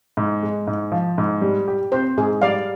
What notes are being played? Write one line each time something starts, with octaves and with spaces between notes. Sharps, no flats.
G#2
G#3
G#2
F3
G#2
G3
G4
C4 C5
G#2 G#4
G3 D5 F5